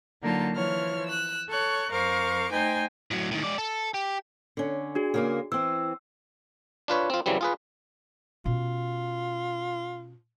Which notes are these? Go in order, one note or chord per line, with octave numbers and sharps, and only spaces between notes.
D3 F#3 A#3 D#4 F4 A5
E3 F3 C#5 F6
E6 F#6
A4 C#5 C#6 F#6
F2 A#4 C5 F5 C#6 D6
A3 D#4 C5 G5 G#5
A2 F#3
A2 D#3
G#3 D5
A4
G4
D3 C#4
D4 F#4 G#4
C#3 A#3 A#4
E3 C4 E6
D4 F4 B4 C#5
C4 F4
C#3 E3 F#3 G3 C4
F4 G#4 B4
B2 C#4 F4